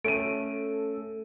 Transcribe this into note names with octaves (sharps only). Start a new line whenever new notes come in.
A3 C#4 A4 D7 D#7